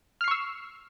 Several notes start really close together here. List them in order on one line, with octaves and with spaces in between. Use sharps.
F6 C7 C#6 E6